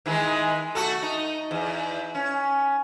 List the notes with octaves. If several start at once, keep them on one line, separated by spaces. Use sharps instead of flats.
D#3 E3 G#3
A3 F#4 A4
D#4
E2
C#4